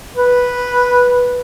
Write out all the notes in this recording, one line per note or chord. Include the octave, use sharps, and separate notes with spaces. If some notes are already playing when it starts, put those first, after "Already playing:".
B4